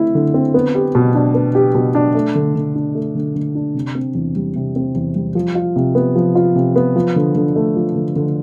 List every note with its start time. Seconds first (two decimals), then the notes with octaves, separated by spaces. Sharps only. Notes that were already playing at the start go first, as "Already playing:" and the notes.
Already playing: D3 A3 C4 E4
0.15 D3
0.34 C4
0.54 B3
0.75 G4
0.95 B2
1.15 D4
1.35 B3
1.55 G4
1.75 B2
1.95 D4
2.15 A3
2.35 D3
2.56 D3
2.75 D4
2.95 A3
3.15 D3
3.35 D3
3.55 D4
3.75 C3
3.95 C4
4.15 E2
4.36 G3
4.56 C3
4.76 C4
4.95 E2
5.15 G3
5.35 F3
5.55 F4
5.76 C3
5.95 B3
6.15 F3
6.35 F4
6.55 C3
6.76 B3
6.96 F3
7.16 D3
7.35 D3
7.56 A3
7.76 F3
7.96 D3
8.16 D3